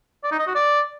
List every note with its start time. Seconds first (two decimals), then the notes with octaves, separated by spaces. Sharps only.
0.24 D5
0.32 D#4
0.40 D#5
0.47 F#4
0.55 D5